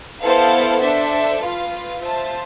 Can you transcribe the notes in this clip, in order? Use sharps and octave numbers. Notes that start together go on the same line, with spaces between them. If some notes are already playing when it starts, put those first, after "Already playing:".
B3 E4 A4 C5 F5
D4 A4 C5 E5
F4 B4 F5
F4 C5 E5 A5